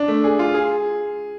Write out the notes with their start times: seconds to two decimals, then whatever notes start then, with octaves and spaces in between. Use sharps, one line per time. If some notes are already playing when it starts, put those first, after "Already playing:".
Already playing: D4
0.08 A3
0.24 G#4
0.39 F4
0.54 G#4